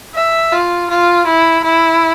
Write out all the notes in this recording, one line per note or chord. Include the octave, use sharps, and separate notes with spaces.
E5
F4
F4
E4
E4